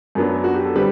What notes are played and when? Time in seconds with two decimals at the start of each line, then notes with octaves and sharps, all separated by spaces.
0.15 F#2 F#3 B3 D4
0.44 F#4
0.54 G4
0.65 A4
0.75 D3 G3 C4 G4 B4